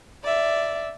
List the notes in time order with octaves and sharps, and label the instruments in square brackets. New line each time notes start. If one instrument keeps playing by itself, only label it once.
[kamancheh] D5 E5